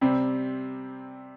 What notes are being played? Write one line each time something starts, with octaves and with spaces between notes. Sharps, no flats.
C3 G3 C4